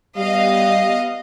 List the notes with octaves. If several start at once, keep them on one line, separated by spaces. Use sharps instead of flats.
G3 B3 D#5 F5